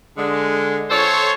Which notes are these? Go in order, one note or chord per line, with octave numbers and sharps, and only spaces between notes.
D3 G#3
F4 A4 C5 C#5